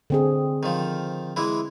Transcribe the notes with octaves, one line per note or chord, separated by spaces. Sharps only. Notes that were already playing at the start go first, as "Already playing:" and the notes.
D3 C4 G#4
D#3 F3
E3 G#3 E4